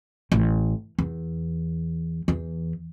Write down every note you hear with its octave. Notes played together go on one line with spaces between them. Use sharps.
A1
E2
E2